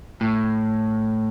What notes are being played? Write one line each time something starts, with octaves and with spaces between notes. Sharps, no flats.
A2